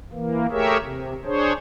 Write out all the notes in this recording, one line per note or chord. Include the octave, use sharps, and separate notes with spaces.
E3 A#3
A3 G4 G#4 A#4 C#5 E5
C3
D4 G#4 C5 C#5